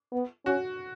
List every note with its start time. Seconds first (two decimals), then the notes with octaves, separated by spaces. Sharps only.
0.12 B3
0.46 C#4 F#4